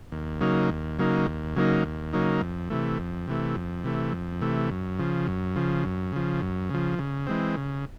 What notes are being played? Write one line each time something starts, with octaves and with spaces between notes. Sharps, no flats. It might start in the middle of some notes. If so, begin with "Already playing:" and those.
D#2
C#3 F#3 A#3 D#4
D#2
C#3 F#3 A#3 D#4
D#2
C#3 F#3 A#3 D#4
D#2
C#3 F#3 A#3 D#4
F2
C3 E3 A3
F2
C3 E3 A3
F2
C3 E3 A3
F2
C3 E3 A3
F#2
C#3 F3
F#2
C#3 F3
F#2
C#3 F3
F#2
C#3 F3
C#3
E3 G#3 C4
C#3